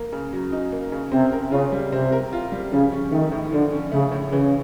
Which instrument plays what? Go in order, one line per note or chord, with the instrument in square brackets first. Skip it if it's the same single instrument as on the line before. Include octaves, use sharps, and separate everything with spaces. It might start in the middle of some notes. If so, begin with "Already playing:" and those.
Already playing: [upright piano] A#3
C#3
F#3
D#4
A#3
C#3
[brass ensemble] C3 [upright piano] C4
[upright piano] A#4
[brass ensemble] C#3 [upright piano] F4
[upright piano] G3
[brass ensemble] C3 [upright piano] C4
[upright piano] A#4
F4
G3
[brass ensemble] C#3 [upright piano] F3
[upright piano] C#4
[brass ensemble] D#3 [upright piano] A3
[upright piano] A2
[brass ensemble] D3 [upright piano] F3
[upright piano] C#4
[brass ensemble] C#3 [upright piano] A3
[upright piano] A2
[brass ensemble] C#3 [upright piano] E3